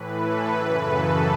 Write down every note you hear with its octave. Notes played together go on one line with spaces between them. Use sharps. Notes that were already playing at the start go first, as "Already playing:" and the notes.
Already playing: A2 E3 B4
A4
F#2 C#3 E3 B4
A4